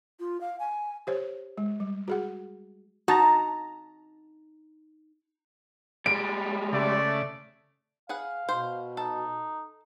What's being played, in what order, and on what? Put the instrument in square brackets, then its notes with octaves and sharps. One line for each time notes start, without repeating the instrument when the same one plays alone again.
[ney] F4
F5
G#5
[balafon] G4 C5 C#5
G#3
G3
F#4 G#4 F#5
[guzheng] D#4 [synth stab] F#4 A5 A#5
[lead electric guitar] G3 G#3 [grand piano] D7
[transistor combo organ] C#3 [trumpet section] A3 D5
[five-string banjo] G#4 B4 F#5 [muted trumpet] F5
[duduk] B2 [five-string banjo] C5
[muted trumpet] D#4 [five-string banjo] A4